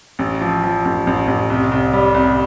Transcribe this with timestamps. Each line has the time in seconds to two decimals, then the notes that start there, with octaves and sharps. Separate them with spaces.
0.19 A1
0.41 F3
0.63 F3
0.85 A1
1.07 A1
1.28 A1
1.50 C2
1.72 C2
1.93 G3
2.14 C2